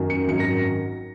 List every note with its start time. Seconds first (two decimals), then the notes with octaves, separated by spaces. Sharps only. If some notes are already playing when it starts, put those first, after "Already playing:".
Already playing: F#2 D#3 F#3
0.10 C#7
0.28 G#1 F#2 D#3 F#3 C#7
0.40 A#6